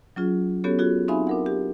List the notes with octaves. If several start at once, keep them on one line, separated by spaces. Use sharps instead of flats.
F#3 C#4 F4 G#4
B3 C#4 F#4 G4 A4 C#5
F4 F#4 G#4
C4 D#4 E5 F5 G#5 B5
D4 A#4 F#5
G4